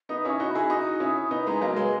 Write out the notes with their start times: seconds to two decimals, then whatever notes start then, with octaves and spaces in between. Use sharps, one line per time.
0.09 B3 D#4 D#6
0.20 D#6
0.25 C#4 E4 C#6
0.40 D#4 F#4
0.50 E4 G#4 B5
0.70 D#4 F#4 D#6
1.00 C#4 E4
1.31 B3 D#4
1.47 G#3 B3 A#5
1.61 F#3 A#3 D#5
1.76 G#3 B4